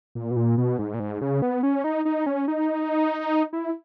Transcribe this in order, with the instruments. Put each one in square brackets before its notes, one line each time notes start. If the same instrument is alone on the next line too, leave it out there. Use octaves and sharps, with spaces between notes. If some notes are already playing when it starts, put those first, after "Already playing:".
[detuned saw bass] A#2
B2
A#2
B2
G#2
A#2
G#2
C#3
B3
C#4
D#4
D#4
C#4
D#4
E4